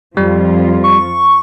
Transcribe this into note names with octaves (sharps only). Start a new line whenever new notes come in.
F2 F3 G3 F4
C#6